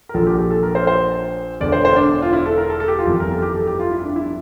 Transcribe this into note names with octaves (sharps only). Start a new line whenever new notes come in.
A#4
A#1 A#2 F3 A4
G4
G4
A4
A#4
C5
C5
E1 E2 D3 D5
C5
C5
D4
F4
E4
A4
A#4
A4
A4
G4
F4
G1 F2 E3 G4
A#4
A4
G4
A4
G4
F4
E4
D4
E4